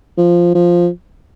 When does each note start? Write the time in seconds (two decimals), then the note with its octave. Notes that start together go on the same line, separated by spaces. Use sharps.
0.17 F3
0.55 F3